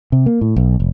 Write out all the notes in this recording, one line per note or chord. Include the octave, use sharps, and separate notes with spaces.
C3
A#3
A2
B1
F1